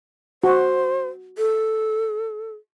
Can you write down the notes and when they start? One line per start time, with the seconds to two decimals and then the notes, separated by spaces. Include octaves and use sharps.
0.44 F#4 C5
1.38 A4